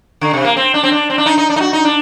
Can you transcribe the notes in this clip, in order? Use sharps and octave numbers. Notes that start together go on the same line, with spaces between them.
D3
C3
A#3
C4
D4
C4
D4
C4
D4
D#4
D#4
D4
D#4
F#4
D#4
D4